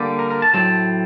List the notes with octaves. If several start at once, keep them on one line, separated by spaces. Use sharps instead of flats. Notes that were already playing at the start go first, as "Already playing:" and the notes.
Already playing: D3 G3 A#3
A#4
A#4
A5
A2 F#3 C4 A5